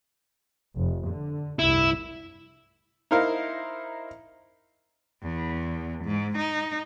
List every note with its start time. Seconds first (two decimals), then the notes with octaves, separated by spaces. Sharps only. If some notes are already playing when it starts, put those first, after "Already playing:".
0.75 F1
1.07 D3
1.59 F1 C2 G2 E4
3.11 D#4 E4 A#4 C5 F5
5.23 E2
6.05 G#2
6.38 D#4